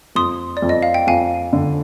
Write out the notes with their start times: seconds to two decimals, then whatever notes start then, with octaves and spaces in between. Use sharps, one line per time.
0.15 F2 C6 D#6
0.57 D5
0.62 F2
0.69 D#5
0.83 F5
0.94 G5
1.07 F2 F5 G#5
1.53 D3